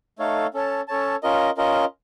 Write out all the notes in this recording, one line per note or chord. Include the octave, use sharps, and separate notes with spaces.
A3 D#4 A4 C#5 F5
C#4 A4 C#5 A5
C#4 A4 C#5 A5
C#4 F4 A#4 D#5
C#4 F4 A#4 D#5